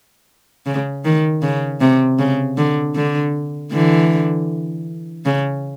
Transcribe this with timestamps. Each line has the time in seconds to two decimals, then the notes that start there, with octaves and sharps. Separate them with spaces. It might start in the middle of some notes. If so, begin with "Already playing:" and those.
0.66 C#3
1.05 D#3
1.42 C#3
1.81 C3
2.19 C#3
2.57 D3
2.96 D3
3.72 D3 E3
5.25 C#3